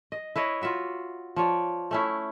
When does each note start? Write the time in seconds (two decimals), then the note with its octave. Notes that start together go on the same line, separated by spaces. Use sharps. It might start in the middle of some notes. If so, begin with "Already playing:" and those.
0.12 D#5
0.36 E4 B4 C#5 D#5
0.62 F4 F#4 E5 F#5
1.36 F3 C#5 D5
1.91 A3 C#4 E4